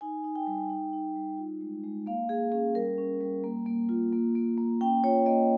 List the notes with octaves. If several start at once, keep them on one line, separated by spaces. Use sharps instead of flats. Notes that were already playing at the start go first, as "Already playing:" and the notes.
D#4 G#5
D#4
G5
G3
D#4
D#4
G3
F4
G#3
G#3
A#3 F5
A#3 G#4
C#4 G#4
G3 A#4
C#4
G3
A#3
A#3
F4
A#3
A#3
A#3
C#4 G5
F4 C#5
A#3 D#5